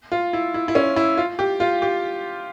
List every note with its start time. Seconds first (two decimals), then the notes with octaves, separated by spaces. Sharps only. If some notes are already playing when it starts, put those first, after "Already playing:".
0.12 F4
0.33 E4
0.54 E4
0.68 E4
0.75 C#4
0.96 E4
1.18 F4
1.39 G4
1.60 F4
1.82 G4